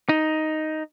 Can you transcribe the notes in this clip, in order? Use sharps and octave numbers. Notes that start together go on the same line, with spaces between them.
D#4